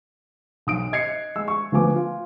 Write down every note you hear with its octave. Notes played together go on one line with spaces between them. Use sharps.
B1 D#6 D7
D#5 G#6 C7 C#7
G#3 E6
C#6
D2 F3 B3 G#5 D6
F4